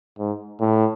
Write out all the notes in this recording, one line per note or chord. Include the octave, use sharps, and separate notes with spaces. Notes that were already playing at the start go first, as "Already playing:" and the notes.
G#2
A2